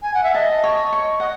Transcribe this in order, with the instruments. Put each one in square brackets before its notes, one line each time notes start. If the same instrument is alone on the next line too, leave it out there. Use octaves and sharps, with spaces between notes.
[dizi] G#5
F#5
E5
[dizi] D#5 [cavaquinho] A5
[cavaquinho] C#5
C#6
[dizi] D#5 [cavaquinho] F#5